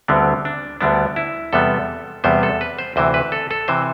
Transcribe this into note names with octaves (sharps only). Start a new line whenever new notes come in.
D2 D3 G3 B3 C4
D4
D2 D3 G3 B3 D4
E4
E2 C3 G3 B3 A4
E2 C3 G3 B3 C5
A4
B4
C5
D2 C3 E3 C5
B4
A4
A4
C3 E3 C5